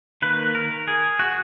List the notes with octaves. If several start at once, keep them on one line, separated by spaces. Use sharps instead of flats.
D#3 A#3 B4
A#4
G#4
F#4